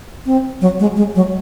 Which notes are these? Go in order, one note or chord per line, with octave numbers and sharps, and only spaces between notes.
C4
F#3
G#3
G#3
F#3